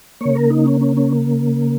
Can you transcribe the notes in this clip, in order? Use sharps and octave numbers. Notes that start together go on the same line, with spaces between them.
C#3 A#3 C#5
A#4
D#4
C#4
C#4
C#4